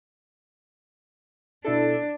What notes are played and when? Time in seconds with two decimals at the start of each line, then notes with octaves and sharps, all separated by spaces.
1.65 B2 D4 E4 A4